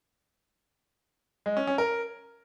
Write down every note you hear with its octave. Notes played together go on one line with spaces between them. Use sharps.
G#3
C#4
C#4
A#4